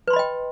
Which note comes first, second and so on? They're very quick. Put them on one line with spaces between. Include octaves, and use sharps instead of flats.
B4 C6 B5 D#5 G5